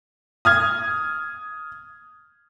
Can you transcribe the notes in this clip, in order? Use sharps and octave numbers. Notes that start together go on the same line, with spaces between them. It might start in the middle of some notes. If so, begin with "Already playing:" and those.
D#6 F6 G#6